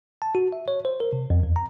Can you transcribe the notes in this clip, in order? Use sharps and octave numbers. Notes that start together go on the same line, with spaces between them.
A5
F#4
E5
C#5
C5
A#4
C3
F2
E2
A#5